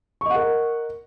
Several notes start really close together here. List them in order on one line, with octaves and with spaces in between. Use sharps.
C#6 D#5 F#5 A#4